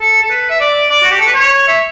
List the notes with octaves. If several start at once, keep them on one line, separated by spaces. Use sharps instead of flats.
A4
A4
B4
E5
D5
D5
F#4
G4
A4
B4
C#5
E5